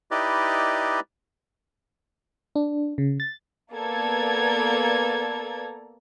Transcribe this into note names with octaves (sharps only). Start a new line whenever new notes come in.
D#4 E4 G4 B4 D5 D#5
D4
C#3
A6
A#3 B3 A4 D5 A#5 G#6